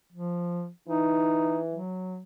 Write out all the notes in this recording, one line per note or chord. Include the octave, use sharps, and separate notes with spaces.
F3
E3 D#4
F#3